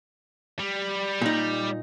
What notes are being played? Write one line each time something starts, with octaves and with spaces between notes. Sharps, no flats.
G3
A#2 D#4